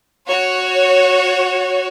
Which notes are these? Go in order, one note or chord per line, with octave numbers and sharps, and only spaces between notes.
F#4 C#5